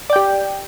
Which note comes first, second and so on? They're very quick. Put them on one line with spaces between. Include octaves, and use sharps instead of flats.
D5 G5 G4